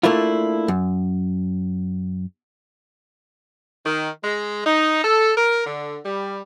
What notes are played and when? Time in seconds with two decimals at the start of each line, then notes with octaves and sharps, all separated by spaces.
0.03 A3 A#3 D4 E4 F4
0.68 F#2
3.86 D#3
4.24 G#3
4.66 D#4
5.04 A4
5.37 A#4
5.66 D3
6.06 G3